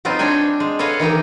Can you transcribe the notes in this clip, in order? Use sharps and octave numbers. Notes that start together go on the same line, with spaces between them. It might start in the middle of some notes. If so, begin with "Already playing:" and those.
F#3 B3 C4 D#4 F4
C4 D4 C#5 G5 G#5
G#3
A4 B4 C#5 D#5 F5 F#5
D#3 E3 D#4 G4